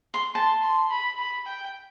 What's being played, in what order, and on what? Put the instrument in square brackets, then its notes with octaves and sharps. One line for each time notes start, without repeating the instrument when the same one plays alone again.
[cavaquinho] C6
[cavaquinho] A5 [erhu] C6
[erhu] C6
B5
B5
G5